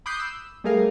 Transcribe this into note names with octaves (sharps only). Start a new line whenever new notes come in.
B5 D6 D#6 F#6 G6 C7
E6
G3 A3 G#4 A#4 F5